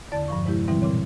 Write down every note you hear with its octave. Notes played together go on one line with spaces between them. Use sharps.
E2 D3 D5 A5 A6
G2 F3 C#6
C3 G#3 E4 G4
B2 D3 E3 G3 C4 E4
A#2 C#3 C4 C#5